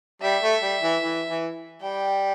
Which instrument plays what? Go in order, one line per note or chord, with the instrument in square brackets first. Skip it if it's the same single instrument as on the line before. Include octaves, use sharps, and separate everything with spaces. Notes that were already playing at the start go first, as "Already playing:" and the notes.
[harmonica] G3 [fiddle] E5
[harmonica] A3
G3
E3
E3
E3
[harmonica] G3 [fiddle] G5